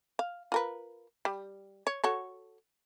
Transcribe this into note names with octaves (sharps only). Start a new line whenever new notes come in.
F5
F4 A#4 B4
G3
C#5
F#4 A4 C#5